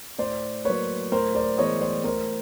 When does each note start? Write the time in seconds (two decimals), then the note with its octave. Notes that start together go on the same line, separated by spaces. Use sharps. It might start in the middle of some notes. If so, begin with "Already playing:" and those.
0.19 A2 C5 D5
0.65 F#3 A#3 B4 C#5
1.11 A2 A#4 C5
1.35 C5 D5
1.58 E3 G#3 B3 C#5 D#5
1.81 C5 D5
2.04 A2 A#4 C5